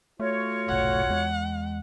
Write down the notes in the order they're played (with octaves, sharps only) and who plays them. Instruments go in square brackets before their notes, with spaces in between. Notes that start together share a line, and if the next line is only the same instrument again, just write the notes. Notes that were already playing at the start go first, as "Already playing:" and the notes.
[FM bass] A3 [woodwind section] F4 F#4 C#5
[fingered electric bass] F1 B1 [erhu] F#5
[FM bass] E2 [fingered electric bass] G#3